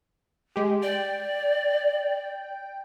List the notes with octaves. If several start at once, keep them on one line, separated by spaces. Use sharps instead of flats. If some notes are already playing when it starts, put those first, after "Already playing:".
G#3 G4
D5 G5